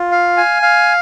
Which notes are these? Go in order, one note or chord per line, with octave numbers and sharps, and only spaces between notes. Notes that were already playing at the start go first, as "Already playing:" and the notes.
Already playing: F4
F5
G#5
F5